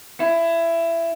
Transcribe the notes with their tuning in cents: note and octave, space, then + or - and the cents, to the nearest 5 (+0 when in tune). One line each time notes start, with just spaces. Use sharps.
E4 +20